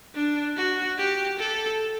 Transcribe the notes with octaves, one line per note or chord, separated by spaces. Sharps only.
D4
F#4
G4
A4